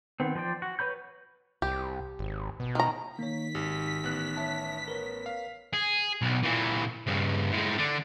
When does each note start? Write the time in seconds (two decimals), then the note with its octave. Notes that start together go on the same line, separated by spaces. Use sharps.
0.20 D#3 B3 C4
0.35 F3 C5 D5 G5
0.62 F#4
0.79 B4 C#5 B5 G6
1.62 C2 G4
2.19 G#1
2.60 B2
2.75 D#3 A#5
3.19 D#3 A#3 C#5 B6
3.55 G#1 G4
4.04 A1 B3 F#6
4.37 C#5 E5 A5
4.88 A#4 B4 C#5
5.26 F5
5.73 G#4
6.22 B1
6.43 A#2 E3
7.07 G2 C#3
7.52 A2 G#3
7.78 D3 D4